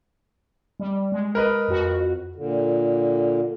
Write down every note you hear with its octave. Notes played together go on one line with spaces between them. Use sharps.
G3
G#3
A#4 B4 D#5
F2 F#4
A#2 D3